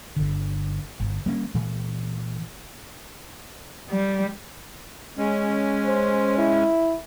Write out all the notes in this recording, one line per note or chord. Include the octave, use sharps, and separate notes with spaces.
G1 D3
G1
G3 A#3 C#4
A#2 E3
G3
G#3 C#4
C5
E4